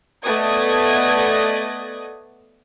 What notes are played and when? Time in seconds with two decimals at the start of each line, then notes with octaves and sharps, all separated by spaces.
0.24 A3 B3 D5 D#5 D#6 G#6